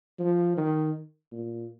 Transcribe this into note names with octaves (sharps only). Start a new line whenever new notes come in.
F3
D#3
A#2